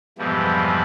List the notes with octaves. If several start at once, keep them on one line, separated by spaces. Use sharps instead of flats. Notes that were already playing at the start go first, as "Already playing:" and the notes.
F2 G#2 B2 E3 F3 G3